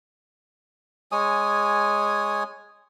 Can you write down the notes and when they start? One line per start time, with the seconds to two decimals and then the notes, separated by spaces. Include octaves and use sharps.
1.12 G#3 C#5 G#5 D#6